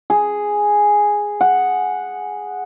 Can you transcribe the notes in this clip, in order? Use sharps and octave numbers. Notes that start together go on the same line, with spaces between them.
G#4
F#5